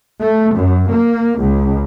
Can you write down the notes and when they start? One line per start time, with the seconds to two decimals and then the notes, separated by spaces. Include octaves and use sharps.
0.21 A3
0.57 F#2
0.91 A#3
1.40 C#2